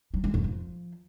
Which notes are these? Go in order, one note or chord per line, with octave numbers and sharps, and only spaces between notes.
F#3
G#3
F2
F3